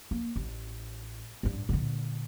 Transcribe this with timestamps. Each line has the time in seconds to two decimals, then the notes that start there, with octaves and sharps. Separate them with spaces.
0.11 A#3
0.36 A1
1.43 A1 G2
1.69 A#2 D3